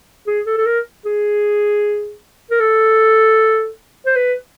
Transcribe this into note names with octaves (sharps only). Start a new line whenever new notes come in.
G#4
A4
A4
A#4
G#4
A#4
A4
C5
B4